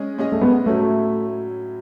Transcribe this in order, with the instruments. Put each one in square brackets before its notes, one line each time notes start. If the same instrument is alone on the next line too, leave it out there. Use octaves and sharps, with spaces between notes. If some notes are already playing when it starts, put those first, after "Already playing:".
Already playing: [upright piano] G#3 C#4 G#4 D#5
G#3 C#4 G#4 D#5
[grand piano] A3
G#3 B3
[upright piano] A2 F#3 C#4 E4 [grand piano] A3